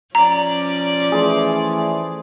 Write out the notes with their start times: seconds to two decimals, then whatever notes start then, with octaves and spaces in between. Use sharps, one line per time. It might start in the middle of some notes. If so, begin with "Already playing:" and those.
0.15 F3 C#4 D5 A#5
1.12 E3 A3 G#4 C5